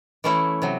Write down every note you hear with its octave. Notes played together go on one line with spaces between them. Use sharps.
E3 A3 C#4 E4
C3 F#3